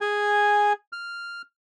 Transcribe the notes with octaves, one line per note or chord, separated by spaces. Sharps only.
G#4 G#5
F6